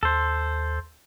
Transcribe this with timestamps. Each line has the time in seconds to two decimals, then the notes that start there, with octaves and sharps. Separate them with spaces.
0.03 D#2 A4 C5